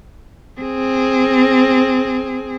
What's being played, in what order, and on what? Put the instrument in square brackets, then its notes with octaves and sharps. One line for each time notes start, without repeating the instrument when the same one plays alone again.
[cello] C4 G#4